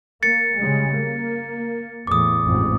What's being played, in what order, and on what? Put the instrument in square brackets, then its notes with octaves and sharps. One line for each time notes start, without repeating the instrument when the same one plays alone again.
[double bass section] A#3 [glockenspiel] A6 C#7
[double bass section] C#3 G3 G#3
A#3
[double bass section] E2 A2 [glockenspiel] D6 D#6
[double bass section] A1 F2 G#2